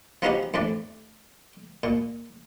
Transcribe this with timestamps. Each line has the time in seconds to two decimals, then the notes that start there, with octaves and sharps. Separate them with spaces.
0.22 F3 B3 C#4 D#4 F#4 G4
0.54 F2 A2 D4 D5
1.83 A#2